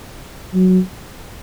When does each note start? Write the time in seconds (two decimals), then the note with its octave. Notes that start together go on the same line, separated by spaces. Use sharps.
0.54 F#3